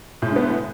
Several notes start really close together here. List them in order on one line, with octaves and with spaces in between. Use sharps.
A2 G#3 D3 B3